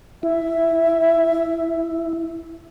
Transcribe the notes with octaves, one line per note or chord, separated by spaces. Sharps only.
E4 E5